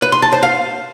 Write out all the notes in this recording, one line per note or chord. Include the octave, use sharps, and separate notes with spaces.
B4
C6
A5
C5
F5